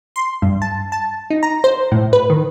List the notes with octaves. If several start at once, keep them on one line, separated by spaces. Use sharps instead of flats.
C6
G2
A5
A5
D#4
A#5
C5
A2
B4
D#3